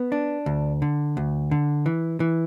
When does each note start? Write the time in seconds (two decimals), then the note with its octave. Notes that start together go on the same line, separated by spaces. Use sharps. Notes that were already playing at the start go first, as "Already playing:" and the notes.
Already playing: B3
0.12 D4
0.46 D2
0.82 D3
1.17 D2
1.51 D3
1.86 E3
2.20 E3